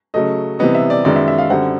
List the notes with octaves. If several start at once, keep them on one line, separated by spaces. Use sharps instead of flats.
C#3 F#3 A3 D#5
C3 E3 G3 B3 D#5
E5
D5
F#2 D#3 G#3 B3 D5
E5
E5
F5
F#2 D3 G3 C4 F#5